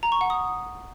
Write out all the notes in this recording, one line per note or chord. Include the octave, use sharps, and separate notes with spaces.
A#5
C#6
F#5
D#6